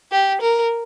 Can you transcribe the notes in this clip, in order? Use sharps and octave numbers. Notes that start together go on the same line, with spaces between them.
G4
A#4